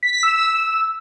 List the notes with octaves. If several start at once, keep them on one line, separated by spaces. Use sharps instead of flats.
B6
B6
E6
E6